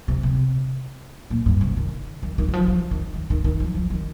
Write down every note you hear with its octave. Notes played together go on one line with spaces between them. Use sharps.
C3
C3
A#2
G2
C3
D#3
D#3
D#3
D#3
F3
F3
D#3
D#3
D#3
D#3
F3
F3
D#3